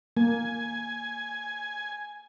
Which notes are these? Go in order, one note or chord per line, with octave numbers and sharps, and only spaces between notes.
A#3 G#5